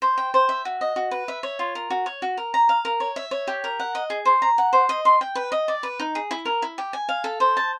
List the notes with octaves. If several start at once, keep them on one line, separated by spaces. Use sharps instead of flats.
C5
G5
C5
E5
F#4
D#5
F#4
B4
E5
C#5
F4
A#4
F#4
C#5
F#4
A#4
A#5
F5
A#4
C#5
E5
C#5
G4
A#4
F#5
D#5
G#4
C5
A#5
F#5
C5
D#5
C6
G5
B4
D#5
D5
B4
D#4
G#4
E4
A#4
E4
G4
G#5
F5
A4
C5
A5